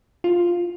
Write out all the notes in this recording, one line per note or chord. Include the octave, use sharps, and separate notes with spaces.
F4